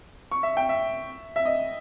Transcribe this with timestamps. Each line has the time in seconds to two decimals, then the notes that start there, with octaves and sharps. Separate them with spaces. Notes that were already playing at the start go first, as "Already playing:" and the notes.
0.32 C#6
0.43 E5
0.57 G5
0.69 E5
1.36 E5
1.45 D#5